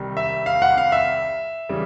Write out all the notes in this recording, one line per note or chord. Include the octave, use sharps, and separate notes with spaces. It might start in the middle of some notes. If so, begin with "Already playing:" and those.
Already playing: C2 C3 D#3 G3
E5
F5
F#5
F5
E5
C#3 E3 G3